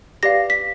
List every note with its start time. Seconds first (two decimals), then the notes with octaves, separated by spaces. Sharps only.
0.23 G4 B4 D5 F5 A#6
0.50 B6